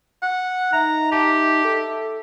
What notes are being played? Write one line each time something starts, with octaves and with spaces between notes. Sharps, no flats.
F#5
D#4 E5 A#5
G4 E5 A5
A4